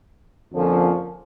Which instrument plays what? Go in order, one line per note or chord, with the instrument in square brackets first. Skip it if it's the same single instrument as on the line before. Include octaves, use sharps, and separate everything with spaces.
[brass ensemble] F2 D3 F3 A#3 C#4